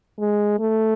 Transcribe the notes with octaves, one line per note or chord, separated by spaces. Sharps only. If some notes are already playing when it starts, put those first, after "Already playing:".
G#3
A3